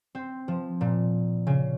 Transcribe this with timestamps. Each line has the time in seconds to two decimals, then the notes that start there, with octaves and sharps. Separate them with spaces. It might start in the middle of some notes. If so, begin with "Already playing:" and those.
0.15 C4
0.48 F3
0.81 A#2
1.47 C#3